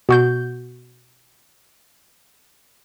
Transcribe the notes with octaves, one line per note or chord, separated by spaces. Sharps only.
B2 F#4 G6